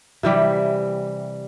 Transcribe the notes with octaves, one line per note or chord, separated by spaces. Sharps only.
C3 E3 G3